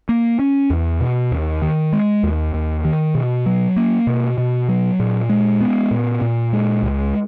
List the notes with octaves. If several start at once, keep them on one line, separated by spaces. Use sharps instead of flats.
A#3
C#4
E2
B2
D#2
D#3
G#3
D#2
D#2
D#3
B2
F#3
A#3
B2
B2
F#3
A#2
G#3
B3
A#2
A#2
G#3
C#2